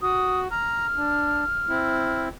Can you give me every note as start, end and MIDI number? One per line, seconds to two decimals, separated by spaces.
0.02 0.48 66
0.02 0.40 87
0.51 0.87 82
0.51 2.24 89
0.97 1.44 62
1.69 2.29 60
1.69 2.29 64